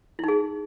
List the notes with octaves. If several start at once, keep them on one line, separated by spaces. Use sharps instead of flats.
D#4 E4 G#4